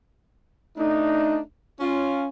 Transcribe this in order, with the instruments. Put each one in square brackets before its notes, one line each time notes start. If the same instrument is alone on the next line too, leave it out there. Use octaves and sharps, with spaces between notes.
[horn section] A3 D4 D#4
C#4 F4